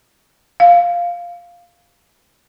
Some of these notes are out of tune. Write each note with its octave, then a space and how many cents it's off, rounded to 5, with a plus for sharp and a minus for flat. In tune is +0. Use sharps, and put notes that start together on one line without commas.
F5 +0